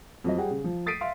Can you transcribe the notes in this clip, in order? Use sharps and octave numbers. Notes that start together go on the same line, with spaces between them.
F2 F#3 D#5
G3 G#4 F#5 G5
C#3
F3
D#6 A6 B6 C7 D7 D#7
E5 F5 C6